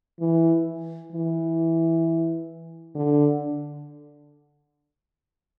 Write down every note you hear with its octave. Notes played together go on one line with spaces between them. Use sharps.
E3
E3
D3